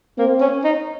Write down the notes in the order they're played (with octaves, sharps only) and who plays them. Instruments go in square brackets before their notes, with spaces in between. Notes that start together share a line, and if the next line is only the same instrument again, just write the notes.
[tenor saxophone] A#3 [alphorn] C4
[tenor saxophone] C#4
D#4